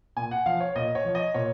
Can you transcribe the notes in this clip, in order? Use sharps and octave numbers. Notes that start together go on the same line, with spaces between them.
A#2 G#5
F#5
F3 F5
C#5
A#2 D#5
C#5
F3
D#5
A#2 C#5